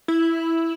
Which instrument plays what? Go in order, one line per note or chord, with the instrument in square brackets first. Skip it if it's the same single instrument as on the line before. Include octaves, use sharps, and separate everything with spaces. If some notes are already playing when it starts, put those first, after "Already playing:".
[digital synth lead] E4